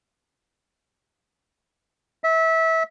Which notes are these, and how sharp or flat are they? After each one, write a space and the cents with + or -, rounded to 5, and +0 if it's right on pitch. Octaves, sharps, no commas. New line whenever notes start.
E5 -25